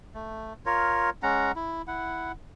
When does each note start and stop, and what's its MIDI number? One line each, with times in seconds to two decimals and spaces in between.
0.14 0.53 57
0.66 1.10 65
0.66 1.10 70
0.66 1.10 73
1.23 1.52 56
1.23 1.52 61
1.23 1.52 78
1.23 1.52 82
1.56 1.82 64
1.87 2.32 64
1.87 2.32 78